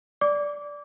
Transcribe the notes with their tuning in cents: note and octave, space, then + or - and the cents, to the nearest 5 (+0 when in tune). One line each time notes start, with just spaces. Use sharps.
D5 -10 D6 -20